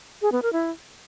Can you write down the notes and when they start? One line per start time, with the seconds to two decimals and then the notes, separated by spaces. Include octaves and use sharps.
0.22 G#4
0.32 B3
0.42 A#4
0.53 E4